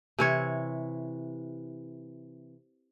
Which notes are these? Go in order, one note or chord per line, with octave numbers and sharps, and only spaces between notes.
C3 E3 C#5